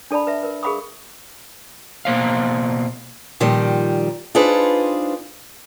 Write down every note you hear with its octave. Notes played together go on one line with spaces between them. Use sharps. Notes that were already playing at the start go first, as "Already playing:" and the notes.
D4 A4 D5 A5 B5
B4 E5
A#4 B4
G#4 A#4 F5 B5 D6 D#6
B2 A#3 C5 F5
A#2 D#3 F3 G3
D4 D#4 F4 G#4 B4 C5